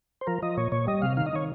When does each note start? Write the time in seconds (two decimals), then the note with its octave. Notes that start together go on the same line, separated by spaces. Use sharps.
0.21 C5
0.27 F3 A#4
0.42 F3 D#5
0.57 A#2 C#5
0.72 A#2 C#5
0.87 G3 D#5
1.02 C3 F5
1.17 D#3 F5
1.26 D#5
1.33 D#3 C#5